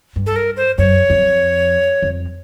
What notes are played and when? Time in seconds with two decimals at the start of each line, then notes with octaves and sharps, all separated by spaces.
0.16 G2
0.26 A4
0.36 A#4
0.57 C5
0.78 F#2 C#5
1.10 F2
2.02 F2